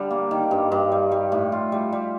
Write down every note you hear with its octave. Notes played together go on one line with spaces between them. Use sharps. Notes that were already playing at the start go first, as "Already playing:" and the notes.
Already playing: D3 G3
A#3
D#3
G2
G2
G3
G3
A2
F4
G3
G3